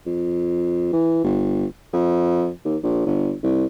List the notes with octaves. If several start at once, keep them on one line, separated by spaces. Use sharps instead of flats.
F2
E3
G1
F2
D#2
A#1
G1
C2